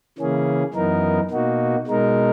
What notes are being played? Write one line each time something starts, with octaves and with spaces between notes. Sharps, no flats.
C#3 E3 A#3 C#4 G#4
F#2 E3 B3 D#4 A#4
B2 A#3 D#4 F#4
B2 G#3 D#4 A#4